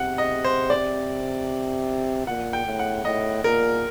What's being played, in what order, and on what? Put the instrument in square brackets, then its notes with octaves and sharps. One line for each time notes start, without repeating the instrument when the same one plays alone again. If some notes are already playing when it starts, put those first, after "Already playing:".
Already playing: [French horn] C3 [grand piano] F#5
[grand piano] D#5
C5
D5
[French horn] A#2 [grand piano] F#5
[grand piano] G5
[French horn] A2
[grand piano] F#5
[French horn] A2 [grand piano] D#5
[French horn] A#2 [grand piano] A#4